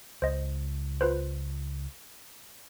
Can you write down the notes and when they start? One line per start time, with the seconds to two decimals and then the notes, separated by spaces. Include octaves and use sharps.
0.22 C#2 C5 D#5
1.01 F4 B4 C5